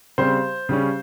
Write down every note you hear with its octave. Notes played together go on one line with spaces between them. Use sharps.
C#3 G3 C4 C5
C#3 G3 C#4